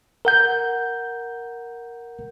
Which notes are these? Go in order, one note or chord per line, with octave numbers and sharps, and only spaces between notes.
A#4 F#5 G6